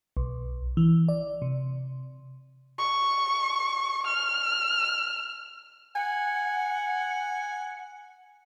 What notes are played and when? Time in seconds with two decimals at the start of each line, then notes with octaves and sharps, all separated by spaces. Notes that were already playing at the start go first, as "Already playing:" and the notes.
0.17 B1
0.77 E3
1.08 D5
1.42 C3
2.79 C#6
4.07 F6
5.95 F#5 G#5